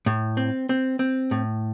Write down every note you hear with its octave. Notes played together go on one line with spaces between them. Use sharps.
A2
C4
C4
C4
A2